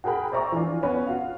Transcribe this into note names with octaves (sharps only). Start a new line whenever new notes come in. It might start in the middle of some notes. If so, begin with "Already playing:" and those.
F#4 G#4 A#4 G5 B5
C5 D5 E5 A#5 C#6 D6
E3 F3 D4 F4
B3 C#4 B4
F4 F#4 F5